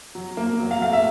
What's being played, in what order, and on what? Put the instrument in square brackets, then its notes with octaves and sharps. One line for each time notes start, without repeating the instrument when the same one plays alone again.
[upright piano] F#3
A#3
F#3
F5
A3 F5
E5